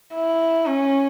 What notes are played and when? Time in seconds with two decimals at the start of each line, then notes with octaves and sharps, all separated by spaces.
0.15 E4
0.66 C#4